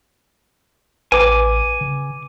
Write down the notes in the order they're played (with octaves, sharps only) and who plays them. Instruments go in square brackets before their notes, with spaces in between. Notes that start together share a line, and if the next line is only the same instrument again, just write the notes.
[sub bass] A1 [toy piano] B4 [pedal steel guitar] G#5 D6
[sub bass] C#3